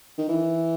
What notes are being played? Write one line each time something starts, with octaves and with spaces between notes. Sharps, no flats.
D#3
E3